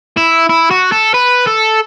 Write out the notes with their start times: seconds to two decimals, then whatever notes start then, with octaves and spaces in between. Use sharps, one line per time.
0.17 E4
0.49 E4
0.71 F#4
0.92 A4
1.14 B4
1.47 A4